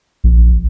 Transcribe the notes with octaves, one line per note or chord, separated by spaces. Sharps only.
A#1